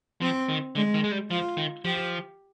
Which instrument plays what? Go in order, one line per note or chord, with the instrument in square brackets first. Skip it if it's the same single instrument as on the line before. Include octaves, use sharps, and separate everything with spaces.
[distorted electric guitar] F3 [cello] C4
[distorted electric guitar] D#3
[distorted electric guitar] D3 [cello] G#3
[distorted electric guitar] D#3
G#3
G3
[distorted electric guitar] F3 [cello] F4
[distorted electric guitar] D#3
[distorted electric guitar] F3 [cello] G4